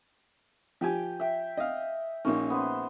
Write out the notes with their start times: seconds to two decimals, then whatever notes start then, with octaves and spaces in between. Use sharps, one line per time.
0.81 F3 G4 G5 G#5
1.20 E5 G5
1.57 D#5 F5
2.25 A#1 A#3 C#4 D#4
2.50 B3 C5 C6